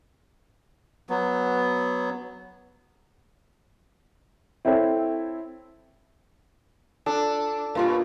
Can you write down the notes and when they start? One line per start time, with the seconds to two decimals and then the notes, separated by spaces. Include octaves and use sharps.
1.10 F#3 B3
4.65 C4 E4 A4 C#5 E5 G5
7.06 D4 A4
7.75 G2 B2 A#3 F4